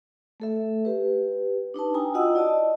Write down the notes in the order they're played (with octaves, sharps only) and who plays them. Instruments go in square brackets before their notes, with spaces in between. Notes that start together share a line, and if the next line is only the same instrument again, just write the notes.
[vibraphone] A3 A4 E5
G4 B4
D4 D#4 B4 A5
E4 G5 G#5 A#5 D#6
F4 F#4 D#5 F#5 D#6 E6
E4 D5 D#5 A5